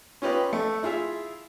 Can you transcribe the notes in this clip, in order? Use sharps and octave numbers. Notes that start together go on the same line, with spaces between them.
C#4 F4 G4 B4 D#5
A3
E4 F4 G#4 E5